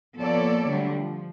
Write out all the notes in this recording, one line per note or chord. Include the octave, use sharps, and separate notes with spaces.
F3 A#3 B3 A4 C#5 D5
D3 F#3 G3 A3
F3